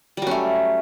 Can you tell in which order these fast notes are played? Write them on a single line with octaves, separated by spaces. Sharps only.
G3 F#3 C#4 A3